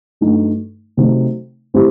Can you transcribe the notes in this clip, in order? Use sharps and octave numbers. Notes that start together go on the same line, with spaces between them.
G2 F#3 A3 D#4
C3 F#3 A3 D#4
A2 F#3 C4 E4 G4